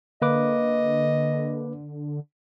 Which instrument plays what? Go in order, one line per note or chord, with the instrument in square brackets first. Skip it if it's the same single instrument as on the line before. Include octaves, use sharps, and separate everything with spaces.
[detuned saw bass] D3 [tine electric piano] A#3 B4 D6 [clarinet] D#5